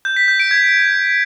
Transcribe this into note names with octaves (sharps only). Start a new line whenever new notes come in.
G6
B6
G6
D7
G#6